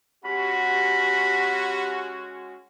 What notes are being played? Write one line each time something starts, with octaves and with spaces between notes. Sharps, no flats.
G#3 C#4 F#4 G4 F#5 B5